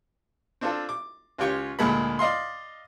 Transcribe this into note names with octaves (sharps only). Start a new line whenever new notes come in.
C4 D4 F4 A4
D6
C#2 C#4 F4 G4 G5 C#6
D2 A#2 G#3 A#3 A4 B5
D5 D#5 F5 C6